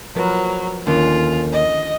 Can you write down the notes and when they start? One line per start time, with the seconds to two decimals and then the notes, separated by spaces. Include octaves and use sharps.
0.16 F3 F#3 A#4 B4
0.87 D#2 D3 D#3 C#4 F4
1.52 D#5